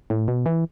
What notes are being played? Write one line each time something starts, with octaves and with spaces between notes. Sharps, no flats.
A2
B2
E3